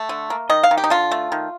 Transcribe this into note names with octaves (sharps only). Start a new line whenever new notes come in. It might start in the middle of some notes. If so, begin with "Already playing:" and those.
Already playing: A3
D3
A#3
D#3 D#5
F5
D#3
G4
D#4
D3 F4
A3
D#3